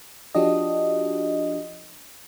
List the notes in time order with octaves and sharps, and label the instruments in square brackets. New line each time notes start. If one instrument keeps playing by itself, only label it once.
[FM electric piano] F3 D4 F#4 G4 D#5